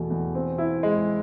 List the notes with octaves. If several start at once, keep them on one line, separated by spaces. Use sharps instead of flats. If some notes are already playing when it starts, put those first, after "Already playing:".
Already playing: E2 B2 A3
E2
C4
E4
G#3